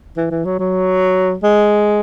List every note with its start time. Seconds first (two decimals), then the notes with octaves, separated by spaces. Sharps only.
0.17 E3
0.31 E3
0.45 F#3
0.59 F#3
1.43 G#3